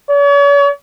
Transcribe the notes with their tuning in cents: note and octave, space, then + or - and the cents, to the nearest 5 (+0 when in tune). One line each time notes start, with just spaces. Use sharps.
C#5 +45